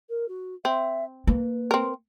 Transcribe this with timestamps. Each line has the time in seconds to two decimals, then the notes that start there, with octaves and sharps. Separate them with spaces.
0.09 A#4
0.28 F#4
0.65 C4 E5
1.27 A#3 B4
1.71 C4 A#4